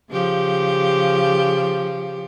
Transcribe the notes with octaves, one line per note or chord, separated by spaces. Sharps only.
C#3 F3 G4